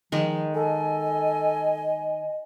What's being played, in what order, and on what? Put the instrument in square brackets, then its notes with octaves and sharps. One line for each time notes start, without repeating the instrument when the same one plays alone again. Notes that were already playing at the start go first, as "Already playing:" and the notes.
[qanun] D#3 G#3 [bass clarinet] F3
[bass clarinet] A4 [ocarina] D#5 [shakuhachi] G#5